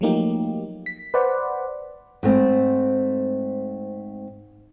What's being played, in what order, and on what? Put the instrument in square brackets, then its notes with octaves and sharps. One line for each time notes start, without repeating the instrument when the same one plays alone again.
[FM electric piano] F3 F#3 A3 A#3 D#4 G4
B6
B4 C5 D5 F#5
[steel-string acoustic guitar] G#2 A3 C4